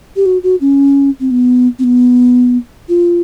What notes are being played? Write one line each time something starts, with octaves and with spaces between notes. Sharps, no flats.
G4
F#4
F#4
C#4
C4
B3
C4
B3
F4